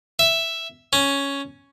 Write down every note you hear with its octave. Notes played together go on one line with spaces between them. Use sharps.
E5
C#4